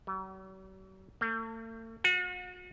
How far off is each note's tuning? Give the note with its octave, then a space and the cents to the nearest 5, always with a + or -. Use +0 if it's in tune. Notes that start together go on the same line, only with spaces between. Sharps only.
F#3 +45
A3 +45
F#4 -40